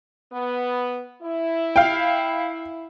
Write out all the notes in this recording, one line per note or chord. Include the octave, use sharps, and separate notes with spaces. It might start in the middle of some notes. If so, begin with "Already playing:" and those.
B3
E4
F5 G5